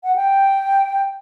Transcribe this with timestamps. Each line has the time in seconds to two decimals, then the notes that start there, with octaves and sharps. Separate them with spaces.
0.04 F#5
0.16 G5